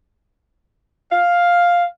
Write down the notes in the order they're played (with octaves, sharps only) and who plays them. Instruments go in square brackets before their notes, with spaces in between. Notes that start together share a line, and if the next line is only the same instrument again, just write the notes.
[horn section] F5